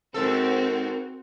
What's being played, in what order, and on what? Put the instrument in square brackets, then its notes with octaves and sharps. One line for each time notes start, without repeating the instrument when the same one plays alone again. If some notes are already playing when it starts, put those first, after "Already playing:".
[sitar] G#2 A4 [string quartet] C4 F#4 [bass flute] A#4